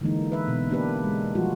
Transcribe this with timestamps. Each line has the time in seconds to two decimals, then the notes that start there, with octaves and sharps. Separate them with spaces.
0.01 D3 E3 G#3 A#3 D#4
0.32 B4 E5
0.48 B2
0.70 A#3 D4 G4 B4
1.04 G#3
1.35 F3 G3 F4 F#4